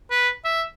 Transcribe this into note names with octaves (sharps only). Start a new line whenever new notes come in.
B4
E5